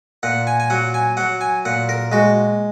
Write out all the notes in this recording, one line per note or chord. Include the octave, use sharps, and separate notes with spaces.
A#2 F#5
G#5
G#5
F#3 F#5
G#5
F#3 F#5
G#5
A#2 F#5
A#4
G#3 F#4